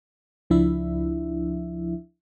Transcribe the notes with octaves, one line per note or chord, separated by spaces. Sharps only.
C#2 F3 D4 E4 E5